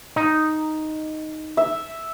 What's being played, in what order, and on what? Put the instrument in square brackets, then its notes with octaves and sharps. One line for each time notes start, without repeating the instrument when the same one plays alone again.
[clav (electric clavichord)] D#4
[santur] E5